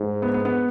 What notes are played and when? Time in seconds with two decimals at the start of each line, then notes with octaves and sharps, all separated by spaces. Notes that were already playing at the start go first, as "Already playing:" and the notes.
Already playing: G#2
0.22 B3
0.34 B3
0.45 B3